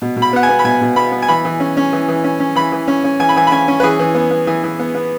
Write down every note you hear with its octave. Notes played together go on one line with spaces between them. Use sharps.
B2
B2
B5
B3 F#5
G#5
B3
B5
B2 G#5
B2
B3 B5
B3
G#5
E3 B5
E3
C#4
C#4
E3
E3
C#4
C#4
E3 B5
E3
C#4
C#4
E3 G#5
B5
E3 G#5
B5
C#4 G#5
C#4
B4
E3 G#4
E3
B3
B3
E3
E3
B3
B3